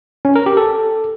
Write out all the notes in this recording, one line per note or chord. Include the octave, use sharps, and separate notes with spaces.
C#4
A#4
G4
A4